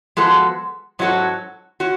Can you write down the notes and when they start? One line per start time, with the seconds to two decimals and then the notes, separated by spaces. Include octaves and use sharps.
0.17 F3 G#3 B3 F#4 A4
0.99 G#2 F#3 C#4 F#4 A4
1.80 C#4 F#4